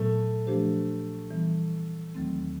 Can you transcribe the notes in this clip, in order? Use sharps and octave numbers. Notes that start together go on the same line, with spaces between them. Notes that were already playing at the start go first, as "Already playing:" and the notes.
Already playing: A#2 F#3 A3 B3
F3 A3 D4 G4 C5
E3 G3 B3
D#2 D#3 F#3 A3 C4